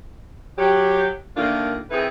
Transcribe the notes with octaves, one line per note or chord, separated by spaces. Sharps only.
F#3 G4
D3 D#3 A3 A#3 D4 F4
D#3 C4 E4 G#4 A4 B4